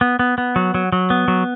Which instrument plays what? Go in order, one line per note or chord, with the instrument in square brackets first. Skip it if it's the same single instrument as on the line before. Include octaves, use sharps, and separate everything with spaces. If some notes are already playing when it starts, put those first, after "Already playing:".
[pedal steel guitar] B3
B3
B3
F#3
F#3
F#3
B3
F#3